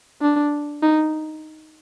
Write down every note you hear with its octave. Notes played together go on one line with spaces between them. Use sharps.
D4
D#4